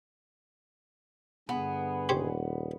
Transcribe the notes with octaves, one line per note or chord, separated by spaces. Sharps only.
G2 D3 B3 G#4
D#1 G4 C5 C#5